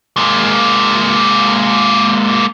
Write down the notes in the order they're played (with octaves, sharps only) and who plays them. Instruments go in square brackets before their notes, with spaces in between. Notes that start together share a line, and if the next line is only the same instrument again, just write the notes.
[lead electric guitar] G#3 A#3